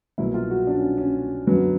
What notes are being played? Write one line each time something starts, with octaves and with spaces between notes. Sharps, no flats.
C2 B2 F#3 A#3 E4
F4
F#4
D4
C#4
C#4
F#2 D3 F#3 B3